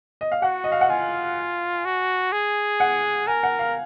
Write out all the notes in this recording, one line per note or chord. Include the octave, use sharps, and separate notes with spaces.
D#5
F5
F#4 F#5
D#5
F5
F#5
F4 G#5
F#4
G#4
F#5
A#4 G#5
F#5
F5